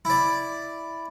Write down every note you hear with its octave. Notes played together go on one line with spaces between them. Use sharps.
E4 D5